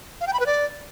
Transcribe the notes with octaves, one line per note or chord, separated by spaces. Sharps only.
F5
G5
B5
B4
D5